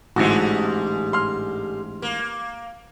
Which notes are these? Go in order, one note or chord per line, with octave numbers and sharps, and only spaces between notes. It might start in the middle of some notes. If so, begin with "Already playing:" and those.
A1 G#2 D3 G3 G#3 E4 F#4
C6 F6
A#3